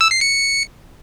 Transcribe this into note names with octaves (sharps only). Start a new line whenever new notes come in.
E6
C7
C#7